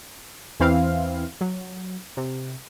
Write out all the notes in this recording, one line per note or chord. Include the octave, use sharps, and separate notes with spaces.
E2 E3 C4 E4 F5
F#3
C3